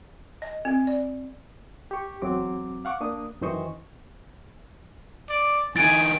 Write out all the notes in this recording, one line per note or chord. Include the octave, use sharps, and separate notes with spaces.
D#5
C4
D5
G4 C#6
E2 F#3 C4 D6
F5 F#5 C#6 D6
A#3 D4 D#6
F#2 D#3 E3 C5 D#5 C#6
D5
E3 D#4 G#5 A6 D7